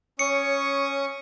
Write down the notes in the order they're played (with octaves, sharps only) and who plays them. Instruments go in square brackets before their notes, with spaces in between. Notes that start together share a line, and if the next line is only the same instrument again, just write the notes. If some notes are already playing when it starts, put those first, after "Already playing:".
[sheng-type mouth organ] C#4 C#6 D#6 [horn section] C#5 [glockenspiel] C#7